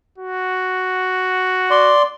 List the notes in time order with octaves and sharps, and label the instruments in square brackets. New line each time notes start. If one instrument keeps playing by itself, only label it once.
[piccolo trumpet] F#4
[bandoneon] D5 C6